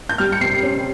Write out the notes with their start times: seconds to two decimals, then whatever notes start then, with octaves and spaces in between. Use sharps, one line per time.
0.09 G6
0.18 G3 F6
0.32 C#7
0.41 C3 C7
0.63 C#4